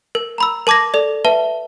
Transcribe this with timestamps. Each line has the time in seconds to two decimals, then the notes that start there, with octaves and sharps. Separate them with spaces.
0.15 A#4
0.38 A#5 B5 E6
0.67 A#4 A5 D6 G#6 A#6
0.94 A4 D5
1.25 B4 E5 A5